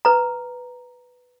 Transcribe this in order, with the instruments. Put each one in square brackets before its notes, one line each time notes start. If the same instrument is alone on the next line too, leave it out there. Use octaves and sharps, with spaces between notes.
[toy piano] B4 A#5